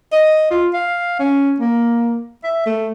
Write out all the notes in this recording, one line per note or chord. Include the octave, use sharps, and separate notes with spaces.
D#5
F4
F5
C#4
A#3
E5
A3